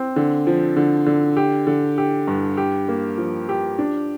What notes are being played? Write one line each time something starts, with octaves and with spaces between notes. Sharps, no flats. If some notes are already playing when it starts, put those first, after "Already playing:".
Already playing: C4
D3
F3
D3
D3
G4
D3
G4
G2
G4
A#3
F3
G4
D4